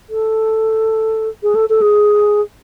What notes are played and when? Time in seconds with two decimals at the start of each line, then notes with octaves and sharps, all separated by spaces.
0.10 A4
1.43 G#4
1.55 A4
1.70 A4
1.82 G#4